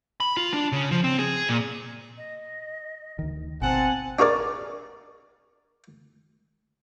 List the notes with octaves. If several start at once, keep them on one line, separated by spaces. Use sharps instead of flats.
B5
F4
D4
C#3
F3
C4
G#4
A#2
D#5
D2 D#3
G#1 B2 C4 F#5 G#5 A5
D4 F#4 G#4 A#4 D5